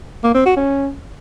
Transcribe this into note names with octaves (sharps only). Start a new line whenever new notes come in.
A#3
C4
F#4
C#4